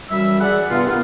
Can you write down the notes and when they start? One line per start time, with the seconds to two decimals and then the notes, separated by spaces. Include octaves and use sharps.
0.09 F#2 E3 G3 E5 E6
0.40 G#4 D5 F#5
0.69 G2 C3 B3 F4
0.86 A#3 B3 E4 F4